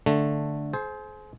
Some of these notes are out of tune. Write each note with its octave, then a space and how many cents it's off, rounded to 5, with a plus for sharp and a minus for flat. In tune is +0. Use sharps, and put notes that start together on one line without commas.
D3 +0 A3 +0
G#4 +40 C5 +0